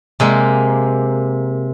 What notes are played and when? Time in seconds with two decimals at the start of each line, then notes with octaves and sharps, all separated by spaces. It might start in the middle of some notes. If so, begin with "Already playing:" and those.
0.20 C3 G#3 A#3